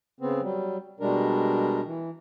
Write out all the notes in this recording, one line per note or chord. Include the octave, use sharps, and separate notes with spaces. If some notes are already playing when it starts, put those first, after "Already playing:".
C#3 B3 C4
F#3 G3
B2 G3 G#3 D4 A#4
E3